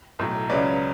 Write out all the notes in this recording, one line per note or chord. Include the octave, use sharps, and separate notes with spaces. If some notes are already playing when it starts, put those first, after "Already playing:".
B1 A2 F#3
C#2 C#3 F#3 C#4 B4 D5